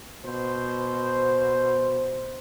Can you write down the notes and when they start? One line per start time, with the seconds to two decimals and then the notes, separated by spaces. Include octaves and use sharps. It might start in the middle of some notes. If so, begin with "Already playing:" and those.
0.24 B2 C5